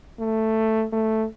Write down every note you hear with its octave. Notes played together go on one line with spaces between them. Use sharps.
A3
A3